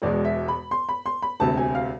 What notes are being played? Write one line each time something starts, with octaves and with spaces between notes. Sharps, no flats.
E1 E2 B2 G#3 D5
E5
B5
C6
B5
C6
B5
E1 D2 C3 A5
G#5
F5